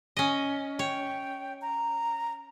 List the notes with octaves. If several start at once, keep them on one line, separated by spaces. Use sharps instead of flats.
C#4 D#5
C#5 G5
A#5